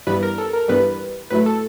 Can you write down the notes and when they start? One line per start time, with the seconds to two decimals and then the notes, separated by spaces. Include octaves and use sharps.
0.07 G2 E3 G3 B3 B4
0.23 A#4
0.38 A4
0.53 A#4
0.68 G2 E3 G3 B3 B4
1.30 A2 F#3 A3 B4
1.46 A4